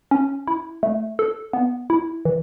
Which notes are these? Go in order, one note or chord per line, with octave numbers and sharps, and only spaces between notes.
C#4
E4
A3
A4
B3
E4
E3